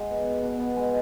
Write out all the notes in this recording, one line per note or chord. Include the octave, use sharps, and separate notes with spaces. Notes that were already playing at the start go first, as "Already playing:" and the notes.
Already playing: G#3 F#4
B3
F#4
B2
B3
G#3